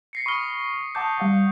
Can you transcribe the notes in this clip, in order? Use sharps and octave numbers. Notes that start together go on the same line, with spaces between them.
A#6 C7 C#7
B5 C#6 D#6 F6 G7
F#5 A5 D6 D#6 G6
G3 F5 F#5